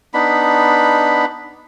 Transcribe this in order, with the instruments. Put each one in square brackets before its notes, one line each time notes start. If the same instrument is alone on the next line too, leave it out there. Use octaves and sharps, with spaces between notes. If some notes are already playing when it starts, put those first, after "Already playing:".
[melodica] B3 D4 D#4 B5